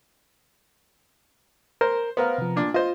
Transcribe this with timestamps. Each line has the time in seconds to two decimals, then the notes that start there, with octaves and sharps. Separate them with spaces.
1.81 A#4 C5
2.17 B3 A#4 C5 F5 F6
2.38 C3 F3
2.56 A#2 D4
2.74 F4 C5 D#5